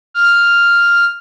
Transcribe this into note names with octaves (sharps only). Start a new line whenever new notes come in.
F6